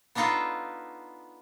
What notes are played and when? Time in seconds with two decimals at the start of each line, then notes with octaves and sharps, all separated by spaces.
0.15 B3 D4 D#4 F4 A4 B4